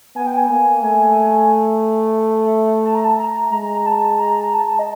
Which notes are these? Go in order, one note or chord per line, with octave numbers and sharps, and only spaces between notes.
B3 G#5
G5
G#5
A#3
A3 G#5
A5
A#5
A5
A#5
G#3 A#5
A5
A#5
A5
D#5